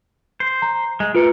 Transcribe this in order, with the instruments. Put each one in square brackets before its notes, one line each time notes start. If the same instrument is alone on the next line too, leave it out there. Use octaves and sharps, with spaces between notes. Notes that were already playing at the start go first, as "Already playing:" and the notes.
[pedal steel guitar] C5
[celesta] A#5
[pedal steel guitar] G#3
[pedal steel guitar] A3 A#4 [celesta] F4 B4 C#7